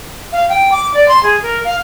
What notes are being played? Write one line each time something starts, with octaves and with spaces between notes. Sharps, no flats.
F5
G5
D6
D5
C6
G#4
A#4
F5